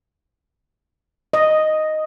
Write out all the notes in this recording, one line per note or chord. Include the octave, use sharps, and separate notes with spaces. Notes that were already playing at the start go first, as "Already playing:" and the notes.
D#5